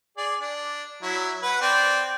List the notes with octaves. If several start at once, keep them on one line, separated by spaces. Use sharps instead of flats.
G#4 D5
D4
F#3 E4
B4 F#5
C4 D5